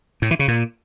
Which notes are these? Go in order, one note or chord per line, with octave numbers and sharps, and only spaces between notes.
A2
E3
C#3
A#2